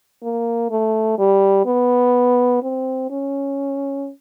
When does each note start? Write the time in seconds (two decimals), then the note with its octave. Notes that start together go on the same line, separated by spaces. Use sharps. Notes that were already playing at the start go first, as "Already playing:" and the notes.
0.23 A#3
0.70 A3
1.18 G3
1.66 B3
2.63 C4
3.10 C#4